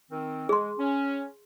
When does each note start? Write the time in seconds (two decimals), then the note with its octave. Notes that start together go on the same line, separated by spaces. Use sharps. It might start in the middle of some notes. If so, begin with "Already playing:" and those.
0.11 D#3 C4
0.49 G#3 G#4 C6
0.78 C#4